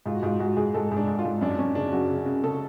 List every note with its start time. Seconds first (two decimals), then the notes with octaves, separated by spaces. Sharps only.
0.06 G#2 F4
0.15 F#4
0.23 G#2 F4
0.40 G#2 F#4
0.56 G#2 G#4
0.74 G#2 A4
0.92 G#2
0.97 D4
1.07 G#2
1.19 F4
1.25 G#2
1.41 F#2 D4
1.59 F#2 C#4
1.75 C#3 D4
1.92 F#2 F#4
2.10 C#3
2.26 C#3
2.44 C#3 A4